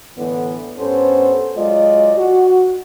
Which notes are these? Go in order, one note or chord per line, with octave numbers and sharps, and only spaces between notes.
A2 D3 E3 B3
G2 B3 C#4 A4 C5
F#3 G#3 F4 D5 D#5
F#4